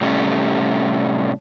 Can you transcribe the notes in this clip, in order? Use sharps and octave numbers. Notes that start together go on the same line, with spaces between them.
A2 C3 G3 A3 C#4